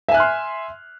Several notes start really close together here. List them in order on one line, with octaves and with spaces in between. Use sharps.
E5 G#5 F#6 F6 C6